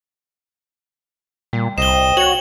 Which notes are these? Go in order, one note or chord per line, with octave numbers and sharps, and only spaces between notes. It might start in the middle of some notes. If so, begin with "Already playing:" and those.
A#2 G3
C2 C5 D#5 G5 E7 G7
F#4 C#5 F#7